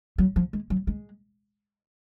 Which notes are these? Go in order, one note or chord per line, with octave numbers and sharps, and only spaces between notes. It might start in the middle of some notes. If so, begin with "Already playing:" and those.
F#3
F3
G#3
F#3
G#3